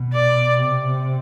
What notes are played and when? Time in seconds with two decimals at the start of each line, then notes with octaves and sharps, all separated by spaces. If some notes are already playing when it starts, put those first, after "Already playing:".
Already playing: B2
0.13 D5
0.57 C3